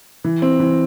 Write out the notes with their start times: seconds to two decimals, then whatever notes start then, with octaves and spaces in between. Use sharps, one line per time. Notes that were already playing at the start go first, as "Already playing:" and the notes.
0.24 E3
0.42 C4
0.60 E3